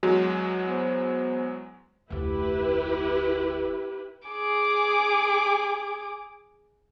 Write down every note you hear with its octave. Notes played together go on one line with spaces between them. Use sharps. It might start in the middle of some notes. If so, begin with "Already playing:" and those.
E2 F#3 G#3 F#4
B3 C5
F1 D2 E4 G4 B4
G#4 D6